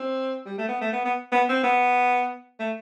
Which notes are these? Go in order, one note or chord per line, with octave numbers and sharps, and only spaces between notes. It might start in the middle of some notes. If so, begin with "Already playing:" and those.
Already playing: C4
G3
A3
B3
A3
B3
B3
B3
C4
B3
A3